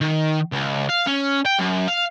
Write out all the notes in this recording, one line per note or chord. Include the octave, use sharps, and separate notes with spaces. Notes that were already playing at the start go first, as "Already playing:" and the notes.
D#3
C#2
F5
C#4
G5
F#2
F5